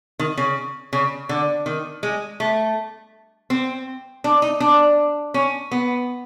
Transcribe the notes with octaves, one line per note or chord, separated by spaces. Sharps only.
D#3
C#3
C#3
D3
D#3
G#3
A3
C4
D4
D#4
D4
C#4
B3